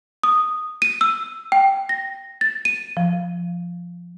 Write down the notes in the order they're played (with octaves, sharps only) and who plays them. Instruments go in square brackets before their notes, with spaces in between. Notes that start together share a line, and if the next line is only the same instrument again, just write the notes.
[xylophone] D#6
D#7
E6
G5
A#6
A6
D#7
[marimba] F3